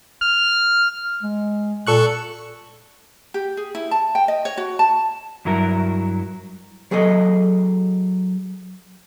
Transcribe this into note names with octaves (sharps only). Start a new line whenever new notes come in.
F6
G#3
A#2 A4 C#6 F#6
G4
G#4
E4
A5
G5
D#5
C#5
F#4
A5
G2 F#3 E4 A#4
F#3 G#4 A4 D#5